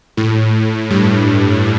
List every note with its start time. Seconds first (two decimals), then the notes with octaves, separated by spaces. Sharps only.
0.17 A2
0.90 G2